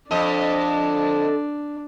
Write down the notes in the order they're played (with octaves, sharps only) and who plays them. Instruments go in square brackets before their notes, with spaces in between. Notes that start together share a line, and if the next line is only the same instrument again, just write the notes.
[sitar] F2 D#5 [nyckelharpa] D4 [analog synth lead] A4